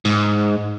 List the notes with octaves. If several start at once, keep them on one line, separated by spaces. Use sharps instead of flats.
G#2